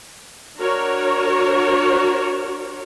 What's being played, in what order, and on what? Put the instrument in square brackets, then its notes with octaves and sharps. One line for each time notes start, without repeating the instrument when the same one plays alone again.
[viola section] D4 F#4 A#4 C#5